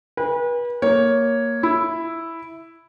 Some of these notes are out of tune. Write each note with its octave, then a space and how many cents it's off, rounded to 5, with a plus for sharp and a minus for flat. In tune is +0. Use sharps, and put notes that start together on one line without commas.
B4 -35 G#5 -45
A#3 +0 C#5 +0
E4 +0 E5 +0